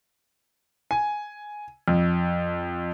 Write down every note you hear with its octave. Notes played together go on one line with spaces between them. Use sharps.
G#5
F2